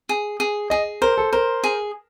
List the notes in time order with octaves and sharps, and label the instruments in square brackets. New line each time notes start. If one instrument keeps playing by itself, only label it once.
[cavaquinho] G#4
G#4
[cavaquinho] G#4 [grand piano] D#5
[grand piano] A#4 [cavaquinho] C5
[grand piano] A4
[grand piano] A#4 [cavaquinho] C5
[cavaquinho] G#4